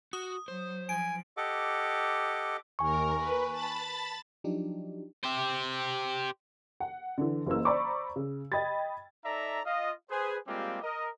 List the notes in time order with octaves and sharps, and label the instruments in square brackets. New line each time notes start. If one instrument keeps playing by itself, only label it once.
[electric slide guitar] F#4 [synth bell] D#6
[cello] F#3 [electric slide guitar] C5
[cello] F3 [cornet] G#5 [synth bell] D7
[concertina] G4 A4 D#5 F#5 D6
[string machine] D#2 A#4 [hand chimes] G#5 C#6
[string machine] B4
A5 B5 A6
[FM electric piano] F3 F#3 D4 D#4 G4
[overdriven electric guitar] G4 C5
[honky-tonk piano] F#5
D3 E3
F#1 C#3 E3 A#3 E6
C5 D5 A#5 B5 C#6 D6
C#3
D#5 G5 B5 G#6 A6
[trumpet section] D#4 A4 D5 E5 A#5
F4 D#5 F5
G#4 B4 C5
G3 G#3 A#3 C4 F4 G4
A#4 D#5